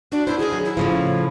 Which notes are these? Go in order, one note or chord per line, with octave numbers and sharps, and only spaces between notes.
D4 F#4
B3 E4 C5
D3 D#3 G#4
F#3
E4
A2 C#3 F3